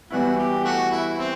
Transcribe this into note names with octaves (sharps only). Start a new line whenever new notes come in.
E3 G3 B3 E4 F#4
G4
A3 F#4
E4
C4